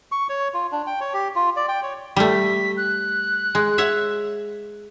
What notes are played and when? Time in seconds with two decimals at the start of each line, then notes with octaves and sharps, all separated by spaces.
0.12 C#6
0.29 C#5
0.54 F4
0.72 D4
0.87 G5
1.01 C#5
1.14 G4
1.36 F4
1.56 D5
1.69 G5
1.83 C#5
2.16 G3 A3 B6
2.77 F#6
3.55 G#3
3.78 C#5 E5 F#5